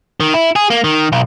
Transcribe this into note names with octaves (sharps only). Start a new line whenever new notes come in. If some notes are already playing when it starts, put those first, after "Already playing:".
D#3
E4
G#4
A#3
D#3
B1